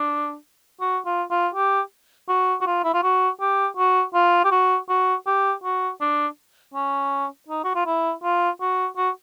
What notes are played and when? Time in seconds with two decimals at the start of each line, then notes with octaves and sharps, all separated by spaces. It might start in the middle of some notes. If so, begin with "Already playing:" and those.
Already playing: D4
0.81 F#4
1.06 F4
1.31 F4
1.54 G4
2.29 F#4
2.61 F#4
2.66 F4
2.84 E4
2.94 F4
3.03 F#4
3.41 G4
3.77 F#4
4.14 F4
4.45 G4
4.51 F#4
4.89 F#4
5.27 G4
5.64 F#4
6.01 D4
6.74 C#4
7.49 D#4
7.64 F#4
7.75 F4
7.86 E4
8.24 F4
8.61 F#4
8.97 F#4